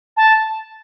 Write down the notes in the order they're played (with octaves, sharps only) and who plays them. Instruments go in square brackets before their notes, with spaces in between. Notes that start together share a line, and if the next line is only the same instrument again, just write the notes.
[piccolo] A5